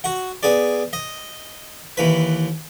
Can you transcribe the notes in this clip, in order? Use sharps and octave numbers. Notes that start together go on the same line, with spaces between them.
F#4 F#5
B3 G#4 D5
D#5
D#2 E3 B4